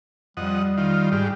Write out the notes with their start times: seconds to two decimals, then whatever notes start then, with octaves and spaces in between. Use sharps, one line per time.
0.37 F2 G3 D#5 F#5
0.77 D#3 F4
1.12 G#2 G4